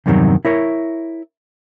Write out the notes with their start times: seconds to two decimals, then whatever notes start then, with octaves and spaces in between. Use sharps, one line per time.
0.06 E2 G2 C3 D#3 F#3
0.45 E4 A#4 C#5